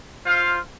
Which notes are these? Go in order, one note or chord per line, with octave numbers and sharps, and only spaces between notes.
F4 C5 F5